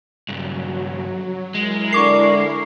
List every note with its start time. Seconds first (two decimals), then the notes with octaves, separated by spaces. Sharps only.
0.29 G2 C#3 F#3
1.55 G#3 E4 A#4
1.92 D3 C#6 D6 C7